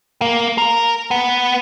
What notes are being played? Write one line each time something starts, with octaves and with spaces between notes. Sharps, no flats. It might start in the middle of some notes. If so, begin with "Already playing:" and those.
A#3
A#4
B3